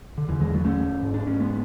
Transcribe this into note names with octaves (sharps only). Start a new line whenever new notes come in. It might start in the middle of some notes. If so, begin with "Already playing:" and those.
D3
E2 D3 E3
E3 G#3
F#3 A3
A3 C#4
G#2
D4
C#4
G#3 B3